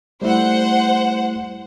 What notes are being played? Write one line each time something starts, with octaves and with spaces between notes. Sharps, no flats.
G3 A3 E4 C5 F#5